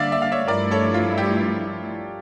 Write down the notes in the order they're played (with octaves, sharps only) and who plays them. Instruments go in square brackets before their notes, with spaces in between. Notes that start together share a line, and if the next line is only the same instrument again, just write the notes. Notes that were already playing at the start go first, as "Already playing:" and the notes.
Already playing: [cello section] D3 G3 A#3 [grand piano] D5 E5 F5
[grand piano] E5
F5
C#5 E5
[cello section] G2 F3 A3 E4 [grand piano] A#4 D5
[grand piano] A4 C#5
F4
G4